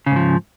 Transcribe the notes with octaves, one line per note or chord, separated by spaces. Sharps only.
G#2 C#3 F3